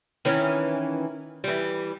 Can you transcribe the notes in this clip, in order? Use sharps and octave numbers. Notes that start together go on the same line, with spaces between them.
D#3 E3 C#4
E3 G3